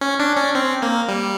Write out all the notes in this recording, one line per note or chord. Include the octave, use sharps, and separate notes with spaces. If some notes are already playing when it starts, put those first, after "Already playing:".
C#4
D4
C#4
C4
A#3
G3